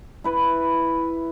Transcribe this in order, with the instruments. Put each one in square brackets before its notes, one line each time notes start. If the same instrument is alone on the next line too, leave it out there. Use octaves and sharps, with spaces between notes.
[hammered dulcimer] E4 B4